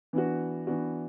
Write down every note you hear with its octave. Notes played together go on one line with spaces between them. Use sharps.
E3 B3 D4 F#4
E3 B3 D4 F#4